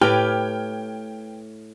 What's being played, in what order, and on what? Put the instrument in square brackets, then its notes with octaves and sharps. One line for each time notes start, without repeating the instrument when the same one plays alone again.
[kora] A2 [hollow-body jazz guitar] G4 [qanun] B4 [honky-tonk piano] G5 F6 G#6